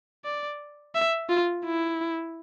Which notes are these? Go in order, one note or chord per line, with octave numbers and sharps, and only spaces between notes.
D5
E5
F4
E4